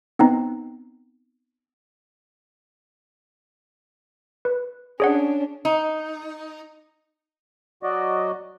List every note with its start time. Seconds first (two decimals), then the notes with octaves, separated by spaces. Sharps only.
0.19 B3 C4 D#4
4.45 B4
5.00 C#4 D4 G#4 C#5 F#5
5.65 D#4
7.83 F#3 F#4 D5 D#5